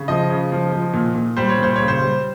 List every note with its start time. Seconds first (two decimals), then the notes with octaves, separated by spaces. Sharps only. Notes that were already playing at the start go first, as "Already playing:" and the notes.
Already playing: C#3
0.08 F3 D#5
0.30 C#3
0.52 F3
0.72 F3
0.93 A#2
1.15 A#2
1.37 G3 C5
1.50 C#5
1.58 A#2 C5
1.76 C#3 C#5
1.88 C5
2.00 G3